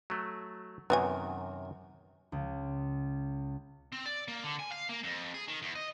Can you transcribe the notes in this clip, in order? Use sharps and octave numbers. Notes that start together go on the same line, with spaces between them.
F#3 A3
F#2 C3 D#3 B3 F#4 G#5
C#2
C4
D5
A#3
D3
G#5
F5
A#3
F2
G#4
D#3
E2
D#5